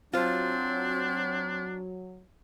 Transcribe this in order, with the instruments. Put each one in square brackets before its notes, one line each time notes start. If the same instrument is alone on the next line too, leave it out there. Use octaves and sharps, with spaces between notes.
[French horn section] F#3 [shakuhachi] C4 [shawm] D4 [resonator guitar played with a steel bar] F4 C5